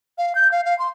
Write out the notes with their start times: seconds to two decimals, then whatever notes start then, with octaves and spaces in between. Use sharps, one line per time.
0.18 F5
0.35 G6
0.52 F5
0.65 F5
0.79 C6